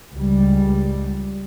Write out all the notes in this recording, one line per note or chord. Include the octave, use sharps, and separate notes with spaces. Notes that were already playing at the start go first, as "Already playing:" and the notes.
C#2 G3